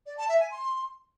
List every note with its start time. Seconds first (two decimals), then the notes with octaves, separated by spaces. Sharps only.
0.06 D5
0.17 A5
0.29 E5
0.40 G#5
0.51 C6